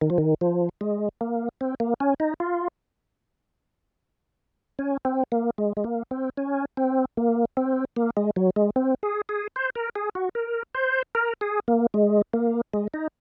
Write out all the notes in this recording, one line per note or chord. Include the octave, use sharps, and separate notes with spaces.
D#3
F3
D#3
F3
G#3
A#3
C4
A#3
C#4
D#4
F4
C#4
C4
A#3
G#3
G#3
A#3
C4
C#4
C4
A#3
C4
A#3
G#3
F#3
G#3
C4
G#4
G#4
C5
A#4
G#4
F#4
A#4
C5
A#4
G#4
A#3
G#3
A#3
G#3
D#4